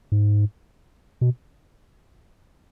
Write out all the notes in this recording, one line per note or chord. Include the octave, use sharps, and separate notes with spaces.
G#2
B2